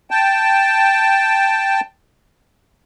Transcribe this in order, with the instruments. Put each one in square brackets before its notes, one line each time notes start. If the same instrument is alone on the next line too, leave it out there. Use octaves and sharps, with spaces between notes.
[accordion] G5 A5